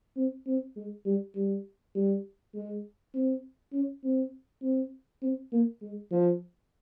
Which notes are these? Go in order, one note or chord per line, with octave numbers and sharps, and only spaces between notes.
C4
C4
G#3
G3
G3
G3
G#3
C4
C#4
C4
C4
C4
A#3
G#3
F3